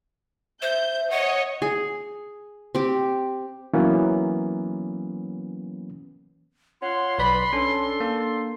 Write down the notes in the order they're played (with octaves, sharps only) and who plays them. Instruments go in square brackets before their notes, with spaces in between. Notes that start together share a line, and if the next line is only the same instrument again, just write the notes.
[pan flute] C5 [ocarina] E5 [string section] G6
[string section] C#5 D#5 [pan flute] F#5
[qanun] G#4
C4 G4
[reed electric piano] E3 F#3 A#3 B3 C#4
[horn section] F4 C#5 F#5 [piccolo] C6
[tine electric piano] B1 B4 D5 [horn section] B5
[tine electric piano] C#4 C#5 [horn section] D4 A4
[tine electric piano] A#3